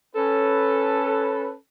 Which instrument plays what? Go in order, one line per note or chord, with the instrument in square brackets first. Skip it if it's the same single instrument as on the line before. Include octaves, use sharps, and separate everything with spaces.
[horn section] C#4 A4 B4